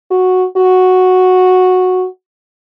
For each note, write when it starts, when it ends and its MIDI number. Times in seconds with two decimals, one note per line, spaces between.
0.11 0.46 66
0.57 2.07 66